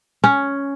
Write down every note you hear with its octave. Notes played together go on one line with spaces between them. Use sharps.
C#4